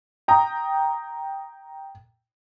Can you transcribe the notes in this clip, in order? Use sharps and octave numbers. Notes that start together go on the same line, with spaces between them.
G5 A#5 D#6